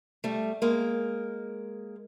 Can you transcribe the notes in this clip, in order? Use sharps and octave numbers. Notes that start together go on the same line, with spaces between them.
G3 A3
G#3 A#3